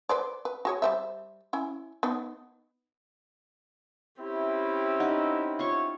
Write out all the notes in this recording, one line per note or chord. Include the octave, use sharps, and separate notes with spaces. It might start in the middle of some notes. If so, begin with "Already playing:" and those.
B4 C5 D5
B4
F#4 G#4 C#5
G3 C5 E5
C#4 E4
B3 D#4
C4 C#4 E4 G4
D#4 F#5
F4 C#5 C#6